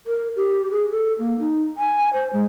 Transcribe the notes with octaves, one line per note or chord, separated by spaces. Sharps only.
A#4
G4
G#4
A4
A#3
D#4
G#5
C5
G#3